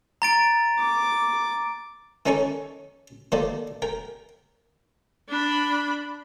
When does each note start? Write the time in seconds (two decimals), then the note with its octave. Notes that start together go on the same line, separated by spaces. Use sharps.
0.22 A#5 A6 D7
0.79 D6
2.26 D#3 C#4 D#4 A4 C#5 C#6
3.32 D#3 F#3 A#3 A4 D5
3.82 A#4 G5
5.29 D4 B5